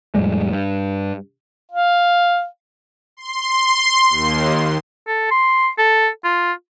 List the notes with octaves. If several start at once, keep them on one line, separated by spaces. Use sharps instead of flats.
F2 A2 G3 G#3
G2
F5
C6
D#2
A4
C6
A4
F4